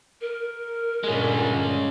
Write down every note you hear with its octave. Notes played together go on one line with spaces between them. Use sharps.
A#4
G2 A#2 D3 G#3 C#4